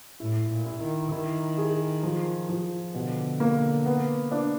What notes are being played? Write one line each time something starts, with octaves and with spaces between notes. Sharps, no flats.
A2 E4
A#2
E4
D#3
D#3 E4
G#4
F3
F3
B2 D3
A#3
B3
D4